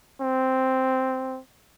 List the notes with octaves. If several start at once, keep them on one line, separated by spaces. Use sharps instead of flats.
C4